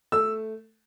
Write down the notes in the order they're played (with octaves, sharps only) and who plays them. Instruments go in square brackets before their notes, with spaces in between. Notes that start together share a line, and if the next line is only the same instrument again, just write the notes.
[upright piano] A3 E6